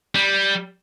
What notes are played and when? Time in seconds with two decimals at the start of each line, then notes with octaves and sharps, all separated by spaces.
0.15 G3